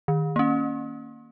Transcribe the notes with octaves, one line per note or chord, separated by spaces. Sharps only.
D#3
A#3 C#4